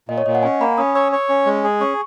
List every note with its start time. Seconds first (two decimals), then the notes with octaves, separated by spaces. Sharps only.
0.09 A#2 D#5
0.18 C#5
0.26 A#2 D#5
0.35 F#5
0.43 C#4 G#5
0.60 A#3 B5
0.78 C#4 D#6
0.95 C#5 E6
1.12 C#5
1.29 C#4
1.46 G#3
1.64 G#4
1.80 C#4 C#6